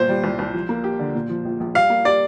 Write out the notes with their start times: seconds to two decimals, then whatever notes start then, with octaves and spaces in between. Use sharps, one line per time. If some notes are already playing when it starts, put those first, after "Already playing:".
Already playing: G1 A#2 C5
0.09 G3
0.24 C2
0.39 C2
0.54 F3
0.69 A#3
0.84 G4
0.99 D3
1.15 A#2
1.29 F3
1.45 A#1
1.60 A#1
1.75 G3 F5
1.90 A#3
2.05 G4 D5